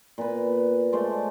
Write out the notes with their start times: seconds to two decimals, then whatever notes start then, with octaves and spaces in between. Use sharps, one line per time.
0.18 A#2 B3 B4
0.93 G#3 A3 C5 D5